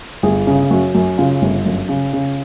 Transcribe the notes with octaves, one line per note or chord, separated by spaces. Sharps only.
G1 G#4
C#3
F#2 F#4
F#2
C#3 F4
G1
F#2
C#3
C#3